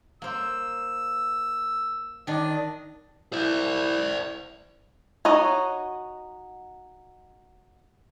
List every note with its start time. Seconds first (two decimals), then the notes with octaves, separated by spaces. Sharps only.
0.22 A#3 C5 E6
2.27 D#3 D4 D#5
3.33 E4 C5 D5
5.25 D#4 F#4 C#5 D#5